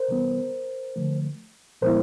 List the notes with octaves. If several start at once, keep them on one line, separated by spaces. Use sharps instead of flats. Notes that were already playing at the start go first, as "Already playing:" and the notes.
Already playing: A#4 C5
C3 E3 G3 B3
D3 F3 A3
A#2 F3 G#3 B3 E4 A#4 C5